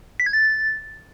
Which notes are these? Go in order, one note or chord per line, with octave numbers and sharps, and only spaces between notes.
B6
G#6
A6